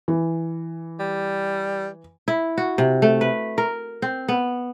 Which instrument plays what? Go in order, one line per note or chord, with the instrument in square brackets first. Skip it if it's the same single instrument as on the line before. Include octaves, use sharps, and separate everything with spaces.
[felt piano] E3
[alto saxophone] G3
[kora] E4
F#4
C3
A3
B4
A#4
C4
B3